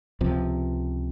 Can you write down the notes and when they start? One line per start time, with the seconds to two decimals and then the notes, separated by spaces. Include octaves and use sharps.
0.21 C#2 C3 F3